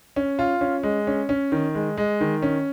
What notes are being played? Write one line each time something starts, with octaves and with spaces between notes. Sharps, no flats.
C#4
F4
C#4
G#3
C#4
C#4
D#3
G#3
G#3
D#3
C#4